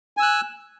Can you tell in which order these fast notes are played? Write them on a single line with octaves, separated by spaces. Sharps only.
G#5 E6 F#6